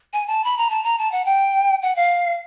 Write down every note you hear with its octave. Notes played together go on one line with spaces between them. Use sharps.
G#5
A5
B5
A#5
A5
A#5
A5
F#5
G5
F#5
F5